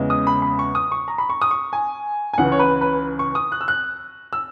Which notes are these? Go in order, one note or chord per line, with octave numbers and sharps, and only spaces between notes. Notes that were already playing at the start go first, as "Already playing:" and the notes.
Already playing: E2 C#3 G#3
D#6
B5
B5
C#6
D#6
C#6
A#5
B5
C#6
D#6
C#6
G#5
G#5
C#2 C#3 E3 F#5
C#5
B4
B4
C#6
D#6
F#6
E6
F#6
E6